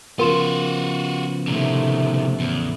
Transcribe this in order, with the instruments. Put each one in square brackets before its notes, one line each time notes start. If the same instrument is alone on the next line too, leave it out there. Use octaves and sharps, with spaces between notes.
[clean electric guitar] C#3 F3 B3 [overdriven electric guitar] F4 F#4 [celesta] A#4 C6 E7
[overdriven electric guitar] A2 D#3 [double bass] C3 A3
[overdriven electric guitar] E2 [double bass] A2